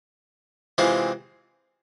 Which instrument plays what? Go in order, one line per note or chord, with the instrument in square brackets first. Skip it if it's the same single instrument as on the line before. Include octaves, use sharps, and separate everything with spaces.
[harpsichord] C3 E3 G#3 C4 F4